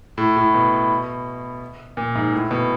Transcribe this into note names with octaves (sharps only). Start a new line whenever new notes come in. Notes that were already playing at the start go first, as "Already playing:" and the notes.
A2
A2
B2
A#2
G#2
A2
B2